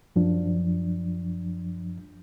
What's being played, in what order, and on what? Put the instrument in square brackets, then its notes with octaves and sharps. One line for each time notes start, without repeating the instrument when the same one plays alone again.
[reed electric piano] F#2 F3 D4